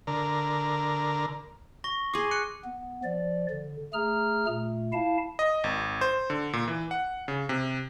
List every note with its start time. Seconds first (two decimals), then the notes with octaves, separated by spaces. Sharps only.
0.07 D3 A#4
1.84 C#6 A#6 G7
2.14 G#4 C6 D6
2.31 F#6 C#7 D#7
2.65 B3
3.04 F3 D5
3.50 D3
3.94 A3 G#4 A#5 F6
4.48 A#2 A3
4.92 E4 F5 A5
5.39 D#5
5.64 G#1
6.01 C5
6.30 D3
6.53 A#2
6.68 E3
6.91 F#5
7.28 C#3
7.49 C3